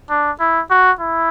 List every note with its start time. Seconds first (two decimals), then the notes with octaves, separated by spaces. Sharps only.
0.10 D4
0.40 E4
0.71 F#4
1.00 E4